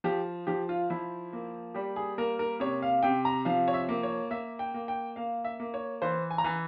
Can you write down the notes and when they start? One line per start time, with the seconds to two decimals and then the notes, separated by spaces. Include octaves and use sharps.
0.04 F3 G4
0.47 F3 G4
0.69 F4
0.90 F3 E4
1.33 A#3
1.75 G3 G4
1.96 G#4
2.18 A#3 A#4
2.39 A#4
2.60 C3 C#5
2.82 F5
3.03 C3 G5
3.25 A#5
3.45 F3 F5
3.68 C#5
3.74 E5
3.89 A#3
4.03 C#5
4.31 A#3 E5
4.59 G5
4.74 A#3
4.88 G5
5.16 A#3 F5
5.44 E5
5.60 A#3
5.74 C#5
6.02 E3 C5
6.31 G#5
6.38 A#5
6.44 E3 G#5